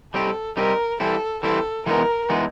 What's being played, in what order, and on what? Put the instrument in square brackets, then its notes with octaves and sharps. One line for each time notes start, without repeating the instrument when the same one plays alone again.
[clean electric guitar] G3 C4 D#4 G4 [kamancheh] A4
[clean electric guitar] G3 C4 D#4 G4 [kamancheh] A#4
[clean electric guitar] E3 G3 C4 E4 [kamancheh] A4
[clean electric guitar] E3 G3 C4 E4 [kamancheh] A4
[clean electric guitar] E3 G#3 B3 D#4 [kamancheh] A#4
[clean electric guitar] E3 G#3 B3 D#4